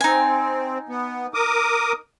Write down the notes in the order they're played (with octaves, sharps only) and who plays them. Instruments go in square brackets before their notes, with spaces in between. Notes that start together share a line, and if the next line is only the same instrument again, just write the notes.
[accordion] C4 [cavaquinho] D#4 G#5
[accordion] B3
A#4 D6 D#6